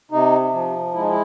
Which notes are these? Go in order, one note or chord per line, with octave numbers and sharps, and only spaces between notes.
C3 D#4
F3
G#3 E4
D#4
E4